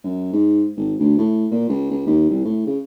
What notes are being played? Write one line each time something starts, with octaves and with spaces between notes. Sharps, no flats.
F#2
G#2
G#1
D2
A2
A#2
C#2
C#2
D#2
C2
A2
C#3